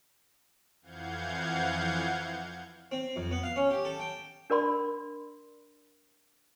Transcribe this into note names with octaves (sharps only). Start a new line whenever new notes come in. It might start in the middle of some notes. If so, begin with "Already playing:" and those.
F2 E3 F5 F#5 G6 G#6
C4
F2
B3
F5
C#4
G4
A4
G5
D4 A#4 D5 B5 C6